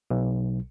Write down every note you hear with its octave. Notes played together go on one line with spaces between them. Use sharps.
B1